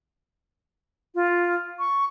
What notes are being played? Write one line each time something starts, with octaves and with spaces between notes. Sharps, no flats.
F4
C#6